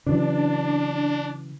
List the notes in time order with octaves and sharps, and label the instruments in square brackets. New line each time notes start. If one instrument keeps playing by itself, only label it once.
[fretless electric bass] C#3 E3 F#3 [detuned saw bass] D4